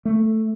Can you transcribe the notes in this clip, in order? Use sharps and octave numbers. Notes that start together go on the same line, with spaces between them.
A3